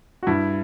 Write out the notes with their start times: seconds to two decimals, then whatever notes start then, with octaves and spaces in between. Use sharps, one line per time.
0.23 F#4
0.27 G2 E4